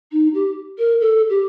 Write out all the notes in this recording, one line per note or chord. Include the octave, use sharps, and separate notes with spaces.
D#4
G4
A#4
A4
G4